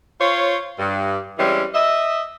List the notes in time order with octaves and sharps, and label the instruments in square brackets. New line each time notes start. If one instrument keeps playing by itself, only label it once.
[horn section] F4 C5 C#5
G2
E3 G3 G#3 C4 C#4
D#5 E5